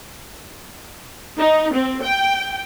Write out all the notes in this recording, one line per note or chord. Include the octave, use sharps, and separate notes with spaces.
D#4
C4
G5